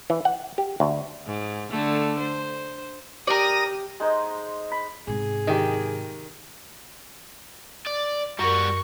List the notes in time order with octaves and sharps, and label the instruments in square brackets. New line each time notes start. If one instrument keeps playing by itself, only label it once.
[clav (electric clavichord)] E3
F#5
G4
D2
[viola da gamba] G#2
D3 A3
C5
[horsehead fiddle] G4 [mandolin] A#4 D5 [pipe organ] D#6 A#6
[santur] G#3 D#4 C5 D#5
B5
[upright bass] G#2 C3 [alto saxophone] G#4
[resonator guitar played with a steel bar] D#3 [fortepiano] G4 D#5
[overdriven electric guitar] D5
[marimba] F#2 A#4 [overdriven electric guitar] G3 F#4 [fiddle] C#6